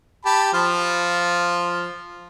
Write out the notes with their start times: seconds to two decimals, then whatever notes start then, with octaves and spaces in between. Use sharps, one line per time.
0.25 G4 A5 B5
0.53 F3 F4